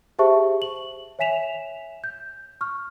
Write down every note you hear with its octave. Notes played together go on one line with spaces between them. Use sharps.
G4 G#4 C5 E5 A5 C#6
F#7
C#5 E5 G#5 B6 E7 F7
G6
C#6 F6